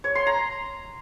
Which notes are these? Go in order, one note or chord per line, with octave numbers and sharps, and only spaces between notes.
C#5
C6
A#5